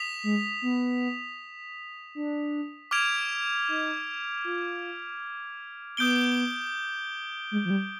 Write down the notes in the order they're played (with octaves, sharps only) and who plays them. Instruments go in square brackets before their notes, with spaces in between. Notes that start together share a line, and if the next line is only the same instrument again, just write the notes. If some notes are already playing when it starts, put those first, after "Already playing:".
Already playing: [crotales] D#6 B6 F7
[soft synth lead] G#3
B3
D4
[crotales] D6 F6 G#6 D7 F7
[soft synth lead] D#4
F4
[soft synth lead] B3 [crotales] D#6 G6 D7 G7
[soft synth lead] G#3
F3
G3